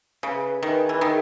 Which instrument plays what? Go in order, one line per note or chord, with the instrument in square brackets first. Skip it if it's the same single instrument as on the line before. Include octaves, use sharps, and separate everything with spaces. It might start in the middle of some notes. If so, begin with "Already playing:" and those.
[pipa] C#3 [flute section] G#4 B4 E5
[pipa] D#3 [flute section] G#4 B4 E5
[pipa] E3
[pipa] D#3 [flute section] G#4 B4 E5